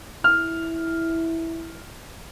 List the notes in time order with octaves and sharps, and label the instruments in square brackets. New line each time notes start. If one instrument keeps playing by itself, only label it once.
[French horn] E4 [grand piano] F6